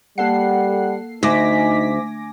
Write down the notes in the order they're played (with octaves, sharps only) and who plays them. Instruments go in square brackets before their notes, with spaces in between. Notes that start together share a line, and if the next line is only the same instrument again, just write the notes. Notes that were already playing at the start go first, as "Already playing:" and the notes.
[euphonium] G3 [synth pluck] A#3 A4 C7 [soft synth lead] F#5
[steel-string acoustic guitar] D2 [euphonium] D#4 [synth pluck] G#5 D6 A#6 [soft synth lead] B6